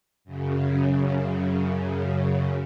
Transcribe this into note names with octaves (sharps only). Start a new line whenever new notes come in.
F#2 C#3